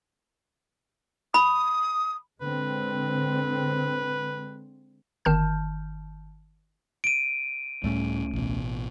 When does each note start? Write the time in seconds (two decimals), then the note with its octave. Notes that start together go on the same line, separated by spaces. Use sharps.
1.34 B5 D#6
2.41 D3 G#3 C4 B4
5.25 G1 D#3 A5 F6 G6
7.04 D7 D#7
7.84 C#2 A2 G3 A3 C#4
8.33 A1 B2